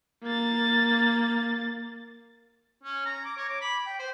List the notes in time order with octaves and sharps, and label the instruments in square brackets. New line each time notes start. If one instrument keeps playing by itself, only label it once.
[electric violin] A#3 A6
[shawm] C#4
A#5
D6
C#5
D6
B5
G5
C5